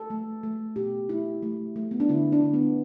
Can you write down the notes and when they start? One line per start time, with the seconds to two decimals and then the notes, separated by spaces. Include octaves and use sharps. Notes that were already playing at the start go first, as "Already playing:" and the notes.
Already playing: A4
0.10 A3
0.43 A3
0.76 B2 G4
1.09 A3 E4
1.43 A3
1.76 A3
1.91 B3
2.00 D4
2.09 D3 E4
2.32 D4
2.43 D3
2.54 B3